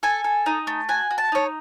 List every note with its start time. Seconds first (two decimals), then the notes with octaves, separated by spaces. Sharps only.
0.03 A4 G#5
0.24 A4
0.46 D#4
0.67 A3
0.89 F#4 G#5
1.11 F#4
1.18 A5
1.32 D#4 C#5